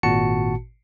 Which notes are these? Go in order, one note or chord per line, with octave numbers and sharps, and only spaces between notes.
G#1 A#2 F#4 A5 C#7